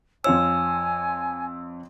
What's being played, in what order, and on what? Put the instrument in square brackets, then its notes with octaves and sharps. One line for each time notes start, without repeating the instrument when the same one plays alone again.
[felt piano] F2 F4 C#5 [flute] G#5 [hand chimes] E6